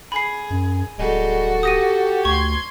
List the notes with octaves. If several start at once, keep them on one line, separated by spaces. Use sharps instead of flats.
G#4 B5 C7
F#2
D1 G3 G#3 F#4 A4
G4 D#6 A#6 D#7
D2 C6 C#6 G#6